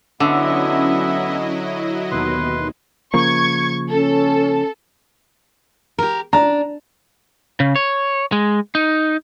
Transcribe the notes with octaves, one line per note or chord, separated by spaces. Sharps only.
D3 F#3 B3 C#4 E4 D#5 E5
D#2 B2 B4 C6
C#3 F3 A#3 C#6 G#6
C#4 A4
G4 A#4
D4 A#5
C#3
C#5
G#3
D#4